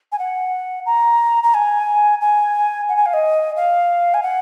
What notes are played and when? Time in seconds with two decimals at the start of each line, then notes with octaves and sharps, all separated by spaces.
0.12 G#5
0.19 F#5
0.86 A#5
1.43 A#5
1.54 G#5
2.21 G#5
2.89 F#5
2.97 G#5
3.06 F5
3.13 D#5
3.56 F5
4.14 G#5
4.23 F#5